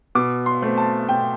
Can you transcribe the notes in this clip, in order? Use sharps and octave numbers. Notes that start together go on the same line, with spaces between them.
B2 D6
C6
A3 C4
A5
B2 G5